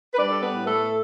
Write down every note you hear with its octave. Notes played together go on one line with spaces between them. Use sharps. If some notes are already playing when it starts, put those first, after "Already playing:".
B4
G3 D4 D5
A4
B3 B4
A2
A3 A4